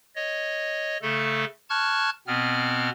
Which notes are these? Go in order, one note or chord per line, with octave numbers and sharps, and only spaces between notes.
C#5 D#5
C#3 A3 A4
A5 C#6 F6 F#6 G#6
B2 B3 C4 F6